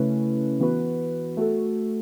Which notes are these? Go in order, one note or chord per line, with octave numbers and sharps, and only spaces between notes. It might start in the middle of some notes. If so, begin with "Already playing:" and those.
Already playing: C#3 A3 C#4 E4 B4
E3 B3 F#4 B4
A3 F#4 A4